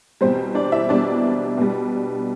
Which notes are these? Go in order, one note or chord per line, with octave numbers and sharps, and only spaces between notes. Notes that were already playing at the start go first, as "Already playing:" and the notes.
E2 B2 G3 C4 C5
D4 D5
E4 E5
E2 B2 G3 D4 D5
B2 G3